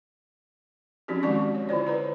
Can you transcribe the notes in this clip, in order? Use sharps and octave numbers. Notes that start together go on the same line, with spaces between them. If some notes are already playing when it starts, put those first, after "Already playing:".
F3 C4 C#4 D#4 F#4 G4
D#3 G#3 F#4 D5 A5 C#6
C#5
D3 E4 F4 C5 D5
B4 C#5 A#5